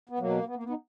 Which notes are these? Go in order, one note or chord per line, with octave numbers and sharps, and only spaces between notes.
B3
B2 F#3 A#3
B3
A#3
B3
D#4